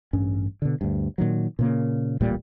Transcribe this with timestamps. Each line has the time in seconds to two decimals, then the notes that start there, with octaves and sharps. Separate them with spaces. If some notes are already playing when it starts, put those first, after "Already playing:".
0.13 A1 G2 C#4
0.62 B2 D3
0.81 D2 G2
1.18 A#2 D#3 F#3
1.59 A#2 C#3 A#3
2.21 D1 A1 A#2 G3